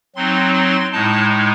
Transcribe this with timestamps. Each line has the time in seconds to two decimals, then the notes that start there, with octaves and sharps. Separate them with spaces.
0.16 F#3 C4 D#4 C6
0.54 C6
0.92 A2 G#3 D#4 A5